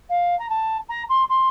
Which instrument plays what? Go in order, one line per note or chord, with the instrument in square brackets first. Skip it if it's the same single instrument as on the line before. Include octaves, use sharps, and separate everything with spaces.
[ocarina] F5
A#5
A5
A#5
C6
C6